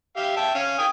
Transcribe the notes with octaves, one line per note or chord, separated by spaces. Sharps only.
G4 E5 F5
E5 G5 A5
C#4 F5
G5 G#5 D#6